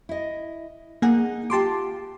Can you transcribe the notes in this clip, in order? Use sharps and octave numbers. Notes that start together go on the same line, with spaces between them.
E4 D#5
A#3 D#4 G#4 F#5
F4 G4 G5 A5 C6 D6